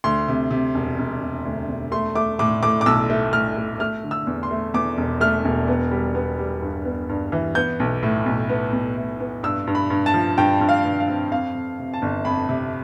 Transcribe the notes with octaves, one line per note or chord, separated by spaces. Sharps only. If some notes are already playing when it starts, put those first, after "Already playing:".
D2 C6
C3
C3
E1
E1
E1
D2
E1
A3 C6
A3 D6
A2 D6
A2 D6
D6
B1 E6
A3
A2 F6
A3
A3 F6
D3
E6
E2
C6
A3
E2 D6
E1
A3 F6
E1
B3
G3
B3
G3
G2
B3
G2
E3
B3 G6
B1
A2
B1
B3
B1
A2
B3
G2 E6
G2
B5
G2
A5
F3
G2 G5
G2
F5
G2
F5
C4
F2 F5
F2
C3
A5
G1
F2 B5
C3